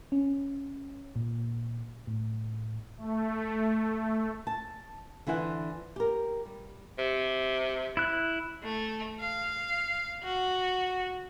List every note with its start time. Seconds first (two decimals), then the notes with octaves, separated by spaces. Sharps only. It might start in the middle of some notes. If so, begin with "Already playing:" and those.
0.12 C#4
1.16 A#2
2.07 A2
2.97 A3
4.47 A5
5.27 D3 E3 E4 C5 F#5
5.96 G4 A#4
6.46 G3
6.98 C3
7.97 E4 F#6
8.63 A3
9.20 F5
10.23 F#4